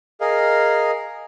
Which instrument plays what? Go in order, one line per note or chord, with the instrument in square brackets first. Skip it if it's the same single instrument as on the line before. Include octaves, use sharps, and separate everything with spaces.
[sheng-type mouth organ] G#4 A#4 D#5 F5